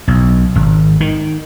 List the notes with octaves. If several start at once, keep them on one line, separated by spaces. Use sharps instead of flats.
B1
G#1
D#3